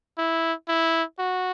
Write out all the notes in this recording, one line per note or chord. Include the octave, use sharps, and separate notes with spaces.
E4
E4
F#4